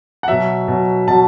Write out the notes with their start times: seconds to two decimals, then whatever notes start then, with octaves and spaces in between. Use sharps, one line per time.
0.23 F#5
0.28 B2 F#3 E5
0.68 B2 F#3
1.08 B2 F#3 A5